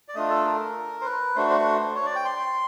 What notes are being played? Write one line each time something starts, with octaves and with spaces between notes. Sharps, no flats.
D5
A3 D4 F4 D#5
A4
A#4
C5
B4
A3 D4 F#4 C5
C5
B4
C5
C#5
D5
G5
C6